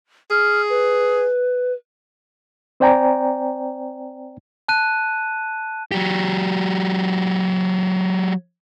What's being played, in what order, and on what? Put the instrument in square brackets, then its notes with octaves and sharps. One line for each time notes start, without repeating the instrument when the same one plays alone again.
[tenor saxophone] G#4 [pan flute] F6
[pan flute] B4
[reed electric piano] C4 C5 D5 G5 G#5 A#5
[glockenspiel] A5 F#6 D#7
[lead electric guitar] F#3 G4